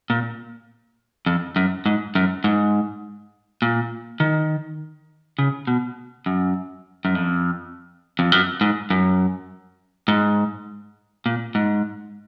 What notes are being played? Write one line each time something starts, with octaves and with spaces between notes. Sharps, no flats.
A#2
F2
F#2
G#2
F#2
G#2
A#2
D#3
C#3
B2
F#2
F#2
F2
F2
F#2
G#2
F#2
G#2
A#2
G#2